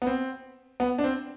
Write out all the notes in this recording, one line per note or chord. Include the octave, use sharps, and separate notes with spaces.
B3
C4
B3
D4
C4